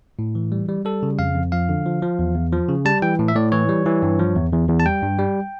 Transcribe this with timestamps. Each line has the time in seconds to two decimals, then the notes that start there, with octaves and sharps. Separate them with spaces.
0.19 A2
0.35 E3
0.52 G3
0.69 G3
0.85 G3 A4
1.03 C#3
1.19 F2 F5
1.35 F2
1.52 F3 F5
1.69 D3
1.86 F3
2.02 F3
2.19 E2
2.35 E2
2.52 F3
2.69 C#3
2.85 G3 A5
3.02 E3 G5
3.19 A2
3.28 E5
3.35 A2 D5
3.52 E3 C#5
3.69 G3
3.86 E3
4.03 G2
4.20 F3
4.35 E2
4.52 E2
4.68 E2
4.80 A5
4.86 G3 G5
5.03 G2
5.19 G3